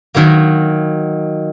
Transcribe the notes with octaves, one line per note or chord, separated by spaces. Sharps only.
D#3 F#3 A#3